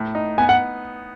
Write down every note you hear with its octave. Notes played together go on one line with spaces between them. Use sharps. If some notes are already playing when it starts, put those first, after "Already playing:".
Already playing: A2
D#4
B3 G#5
F#5